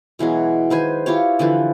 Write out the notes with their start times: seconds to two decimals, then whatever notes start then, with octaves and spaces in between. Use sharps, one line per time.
0.19 B2 E3 F#3 G#3
0.70 D#3 B4 C5 G#5
1.06 E4 F4 G4 C#5
1.39 D3 E3 F3 B4